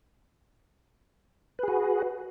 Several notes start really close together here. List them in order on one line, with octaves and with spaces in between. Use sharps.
B4 G#4 F#4